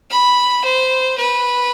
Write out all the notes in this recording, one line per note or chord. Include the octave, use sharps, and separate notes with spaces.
B5
C5
B4